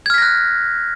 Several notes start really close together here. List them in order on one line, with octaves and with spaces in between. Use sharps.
G#6 F6 B6 A#6 F#6